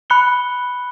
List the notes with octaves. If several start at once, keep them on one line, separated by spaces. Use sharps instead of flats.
B5 F#6 C#7 G7